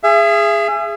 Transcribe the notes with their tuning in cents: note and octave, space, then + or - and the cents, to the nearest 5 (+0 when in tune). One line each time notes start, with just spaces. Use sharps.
G#4 -10 E5 +35